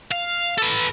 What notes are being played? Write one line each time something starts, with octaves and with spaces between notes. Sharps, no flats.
F5
A4 B4